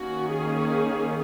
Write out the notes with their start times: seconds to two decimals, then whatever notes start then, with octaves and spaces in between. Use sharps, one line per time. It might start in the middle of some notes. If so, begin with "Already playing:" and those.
Already playing: D#3 A#3 C#4 F#4
0.31 G#4